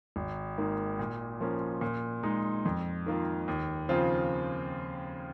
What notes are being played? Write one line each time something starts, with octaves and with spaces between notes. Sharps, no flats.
G#1
G#2 D#3 A#3
A#2
F3 A#3 C#4
A#2
G#3 D#4
F2
D#3 A#3 F4
D#2
C#3 F3 C4 F4